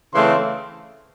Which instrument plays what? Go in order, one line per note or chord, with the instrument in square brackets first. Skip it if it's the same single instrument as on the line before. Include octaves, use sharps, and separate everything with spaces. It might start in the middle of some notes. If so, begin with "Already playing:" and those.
[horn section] C#3 E3 A3 C4 C6